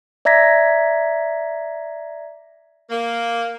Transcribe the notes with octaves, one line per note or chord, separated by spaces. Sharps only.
D5 E5 A#5 G#6 A#6 B6
A#3